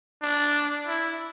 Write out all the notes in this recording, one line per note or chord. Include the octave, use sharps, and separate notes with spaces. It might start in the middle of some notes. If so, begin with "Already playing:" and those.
D4
E4